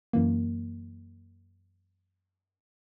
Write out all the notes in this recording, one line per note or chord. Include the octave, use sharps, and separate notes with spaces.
F#2 E3 A#3